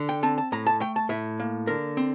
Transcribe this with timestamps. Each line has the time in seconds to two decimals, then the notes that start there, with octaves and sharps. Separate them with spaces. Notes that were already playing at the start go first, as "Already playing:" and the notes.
Already playing: D3
0.09 G5
0.23 C4 A5
0.38 A5
0.52 A2 A#5
0.67 A5
0.81 A3 G5
0.96 A5
1.09 A2 E5
1.40 A#3
1.67 D3 A#4
1.97 C4